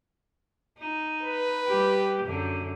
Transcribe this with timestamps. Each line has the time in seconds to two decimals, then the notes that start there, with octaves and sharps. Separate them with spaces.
0.79 D#4
1.22 B4
1.67 G3 G4
2.25 F#2 D3